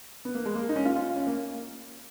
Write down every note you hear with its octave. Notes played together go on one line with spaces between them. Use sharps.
B3
A#3
G#3
A#3
D#4
C#4
F4
F4
C#4
A#3